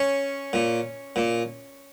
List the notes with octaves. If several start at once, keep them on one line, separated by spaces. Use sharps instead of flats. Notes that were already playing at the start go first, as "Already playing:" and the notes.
Already playing: C#4
A#2
A#2